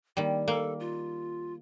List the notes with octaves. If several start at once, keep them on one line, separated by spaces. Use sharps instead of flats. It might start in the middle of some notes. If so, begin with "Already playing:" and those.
D#3 G3 A#3
A#3 A4
F4